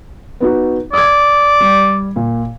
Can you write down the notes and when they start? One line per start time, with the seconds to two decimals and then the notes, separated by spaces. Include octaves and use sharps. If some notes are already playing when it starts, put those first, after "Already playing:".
0.40 B3 D#4 F#4
0.93 D5 D#6 E6 G#6
1.60 G3
2.16 A#2